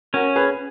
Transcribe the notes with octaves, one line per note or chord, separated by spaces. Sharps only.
C#4 F#4 A#4
G#4 B4